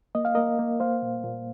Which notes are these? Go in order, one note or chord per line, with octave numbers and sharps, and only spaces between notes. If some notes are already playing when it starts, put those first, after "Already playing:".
A#3 D#5
F5
A#3 A#4 D#5
A#3
A#3 C5 F5
A#2
A#2